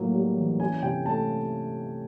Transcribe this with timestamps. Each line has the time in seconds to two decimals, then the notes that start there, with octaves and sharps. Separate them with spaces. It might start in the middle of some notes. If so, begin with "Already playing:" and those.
Already playing: A2 F#3 A#3
0.14 G3
0.37 E3
0.60 C#4 G#5
0.82 C3 G5
1.06 A3 A5